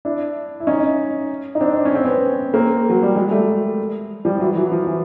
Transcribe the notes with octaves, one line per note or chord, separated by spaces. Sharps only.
D4 E4
E4
C#4 D#4
D#4
C4 D4
D4
C#4
C4
B3 C#4
A#3 C4
F#3
G3
F#3 G#3
G3 A3
F3 G3
E3 F#3
E3 F#3
F3
E3